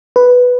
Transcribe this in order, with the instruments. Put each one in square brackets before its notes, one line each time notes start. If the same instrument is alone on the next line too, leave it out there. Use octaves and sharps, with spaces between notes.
[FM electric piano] B4